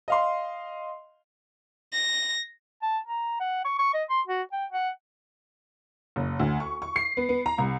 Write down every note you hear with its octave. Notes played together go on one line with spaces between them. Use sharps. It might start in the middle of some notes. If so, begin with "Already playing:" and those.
D#5 F5 C6
A#6
A5
A#5
F#5
C#6
C#6
D#5
C6
F#4
G5
F#5
F#1
D2
C#6
C#6
C7
B3
B3
A#5
C2